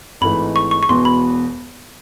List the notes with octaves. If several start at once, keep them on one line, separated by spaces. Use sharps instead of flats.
G#1 G#2 E3 A3 B5
C#6
C#6
C#6
E1 E2 B2 C6
B5